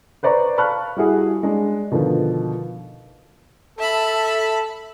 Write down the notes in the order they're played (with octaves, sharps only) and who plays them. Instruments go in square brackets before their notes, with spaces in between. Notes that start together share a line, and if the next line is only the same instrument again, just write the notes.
[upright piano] B4 C5 D5 A#5 C#6
F5 A5 B5 C#6 F6 F#6
G3 E4 F#4 G#4
G#3 D4
B2 D3 D#3 F3
[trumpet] A4 [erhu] E5 [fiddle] A5 B5